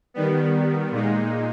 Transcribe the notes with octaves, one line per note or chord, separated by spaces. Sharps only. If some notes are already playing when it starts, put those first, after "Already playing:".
D#3 G3 B3
A#2 G#3 D#4